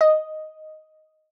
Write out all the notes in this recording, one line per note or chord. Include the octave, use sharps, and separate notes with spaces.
D#5